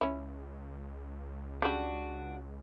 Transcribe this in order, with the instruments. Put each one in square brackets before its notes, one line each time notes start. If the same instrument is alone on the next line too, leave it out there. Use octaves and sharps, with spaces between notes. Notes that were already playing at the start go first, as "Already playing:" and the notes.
[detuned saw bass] C#2 [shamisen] C#4 E4
[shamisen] C#3 G3 [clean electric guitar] D4 F#4